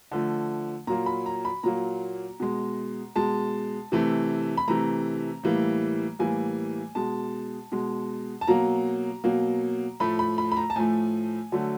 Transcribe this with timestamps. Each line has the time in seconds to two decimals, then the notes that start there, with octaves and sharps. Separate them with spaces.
0.11 D3 F3 A3
0.87 A#2 F#3 A#3 A#5
1.06 B5
1.26 A#5
1.45 B5
1.63 A#2 F#3 A#3 A#5
2.40 B2 G#3
3.16 B2 G#3 A5
3.92 C3 E3 A3
4.57 B5
4.68 C3 E3 A3 A#5
5.43 A2 E3 G3 A#3
6.19 A2 E3 G3 A#3 G#5
6.95 B2 G#3 A5
7.72 B2 G#3
8.41 A5
8.48 B2 F#3 A#3 A#5
9.24 B2 F#3 A#3
10.00 A2 F3 A3 B5
10.19 B5
10.38 B5
10.52 B5
10.57 A#5
10.70 A5
10.76 A2 F3 A3 G#5
11.52 D3 F#3 A3